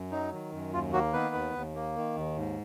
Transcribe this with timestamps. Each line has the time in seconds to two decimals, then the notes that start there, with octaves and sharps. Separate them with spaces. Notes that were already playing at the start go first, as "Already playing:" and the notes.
Already playing: F#2
0.11 F#3 D#4
0.32 D#3
0.53 F#2
0.73 D#2 F4
0.93 F#3 A#3 F#4
1.13 D#3 B3 B4
1.35 D#2
1.55 D#2
1.75 A#3
1.96 D#3
2.16 D#2
2.37 G#2